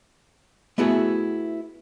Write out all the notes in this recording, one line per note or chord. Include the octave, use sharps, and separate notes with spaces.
A3 B3 E4 F#4 G#4